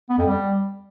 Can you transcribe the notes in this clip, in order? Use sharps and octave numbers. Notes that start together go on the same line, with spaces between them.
B3
F2
G3